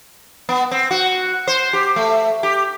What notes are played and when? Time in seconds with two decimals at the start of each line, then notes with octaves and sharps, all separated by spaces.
0.49 B3
0.71 C4
0.91 F#4
1.47 C5
1.73 G4
1.96 A3
2.43 G4